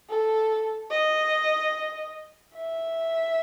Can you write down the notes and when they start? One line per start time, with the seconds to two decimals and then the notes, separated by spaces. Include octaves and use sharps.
0.09 A4
0.91 D#5
2.55 E5